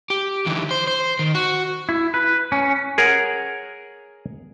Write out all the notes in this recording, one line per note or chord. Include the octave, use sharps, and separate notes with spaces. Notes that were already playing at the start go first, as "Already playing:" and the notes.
G4
D3 E3
C5
C5
D#3
F#4
E4
B4
C#4
G#4 A#4 C#5 F#5